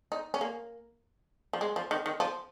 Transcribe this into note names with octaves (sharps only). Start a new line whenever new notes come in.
D#4
C#4
A#3
F3
G#3
F3
D#3
D#3
F3